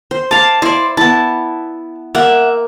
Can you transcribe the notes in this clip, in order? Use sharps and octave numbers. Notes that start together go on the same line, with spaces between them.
C5
F5 A5 D6
E4 C5 D5
B3 E4 A5
A#3 E5 F#5